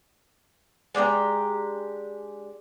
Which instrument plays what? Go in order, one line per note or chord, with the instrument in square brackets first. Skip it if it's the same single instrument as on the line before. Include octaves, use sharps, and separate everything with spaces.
[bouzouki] G#3 D4 G4 A#5